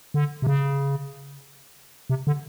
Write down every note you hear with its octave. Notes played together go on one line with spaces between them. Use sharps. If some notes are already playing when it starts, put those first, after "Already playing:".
D3
C3
C#3
C3
D3